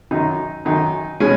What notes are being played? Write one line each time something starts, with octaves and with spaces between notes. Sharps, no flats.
F#2 D#3 F#3 D#4
F#2 D#3 F#3 D#4
B2 G#3 C#4